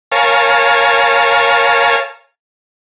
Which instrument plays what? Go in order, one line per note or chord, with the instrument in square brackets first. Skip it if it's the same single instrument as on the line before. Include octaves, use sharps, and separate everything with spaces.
[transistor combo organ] A#4 C#5 F5 G#5 A5